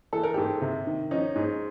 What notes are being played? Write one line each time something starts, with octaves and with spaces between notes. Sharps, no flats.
E3 A4
A#4
G#2 G4 A4
C3
D#3
F3 C#4 D#4
G#2